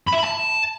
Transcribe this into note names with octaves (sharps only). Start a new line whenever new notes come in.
B5
E5
B5
A5